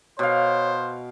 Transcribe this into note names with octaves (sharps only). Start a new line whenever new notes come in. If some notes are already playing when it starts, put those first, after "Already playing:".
B2 C5 C#5 F5